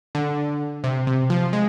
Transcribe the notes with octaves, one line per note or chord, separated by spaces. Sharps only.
D3
C3
C3
F3
G#3